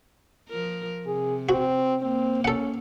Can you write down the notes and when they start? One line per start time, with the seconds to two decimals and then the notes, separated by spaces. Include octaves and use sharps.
0.49 F3 A#4
1.07 C3 G#4
1.49 C4 F#4
2.02 A#3 C4
2.45 C#4 A4 F#5